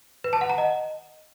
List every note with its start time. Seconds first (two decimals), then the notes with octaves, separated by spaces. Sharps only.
0.24 B4
0.33 A5
0.41 F#5
0.50 A#5
0.58 D#5